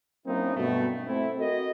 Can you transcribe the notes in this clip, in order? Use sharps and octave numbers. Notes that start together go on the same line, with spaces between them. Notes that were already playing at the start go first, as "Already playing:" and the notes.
F#3 A#3 C4 C#4 D#4 E4
G2 B2 A3
A3 C4 E4
F#4 A4 A#4 D#5